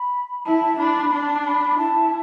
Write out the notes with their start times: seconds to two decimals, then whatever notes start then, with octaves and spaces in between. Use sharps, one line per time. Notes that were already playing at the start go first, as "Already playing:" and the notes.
Already playing: B5
0.46 E4 A5
0.79 D4 B5
1.12 D4 A5
1.46 B5
1.78 E4 A5